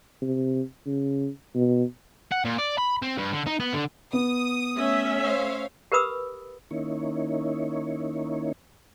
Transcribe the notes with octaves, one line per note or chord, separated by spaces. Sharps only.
C3
C#3
B2
F#5
A#2
D5
B5
C4
G2
D3
D#4
B3
D3
B3 D#6
A3 C#4 E5
C5 C#5 F5
G4 A#4 B4 B5 D#6 E6
D#3 A#3 C#4 D#4 E4 C#5